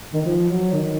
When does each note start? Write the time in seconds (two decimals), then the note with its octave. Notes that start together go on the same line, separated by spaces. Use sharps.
0.13 D#3
0.25 F3
0.49 F#3
0.72 D#3